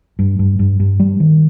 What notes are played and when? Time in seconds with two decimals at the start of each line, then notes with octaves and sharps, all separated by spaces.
0.19 G2
0.39 G2
0.59 G2
0.80 G2
1.00 G3
1.20 D#3